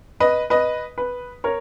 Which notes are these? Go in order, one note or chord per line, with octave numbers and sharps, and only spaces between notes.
B4 D#5
B4 D#5
B4
A#4 C#5